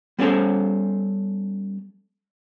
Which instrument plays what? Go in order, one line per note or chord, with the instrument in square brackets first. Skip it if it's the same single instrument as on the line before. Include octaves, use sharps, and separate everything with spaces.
[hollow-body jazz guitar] G3 B3 C#4 G#4 A4 C5